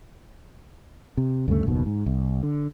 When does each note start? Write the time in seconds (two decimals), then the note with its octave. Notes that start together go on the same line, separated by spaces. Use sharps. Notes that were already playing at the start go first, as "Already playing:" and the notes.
1.17 C3
1.48 D2 G2 C#3 A3
1.66 F#1 D#2 B2 D#3
1.86 G#2
2.06 C2
2.43 D3